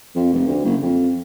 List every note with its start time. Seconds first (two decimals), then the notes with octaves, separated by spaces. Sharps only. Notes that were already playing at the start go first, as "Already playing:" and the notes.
0.15 F2
0.33 F1
0.47 D2
0.65 F#1
0.81 F2